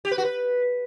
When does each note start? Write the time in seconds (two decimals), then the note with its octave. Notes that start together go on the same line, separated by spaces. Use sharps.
0.05 G4
0.11 B4
0.18 F#4
0.25 B4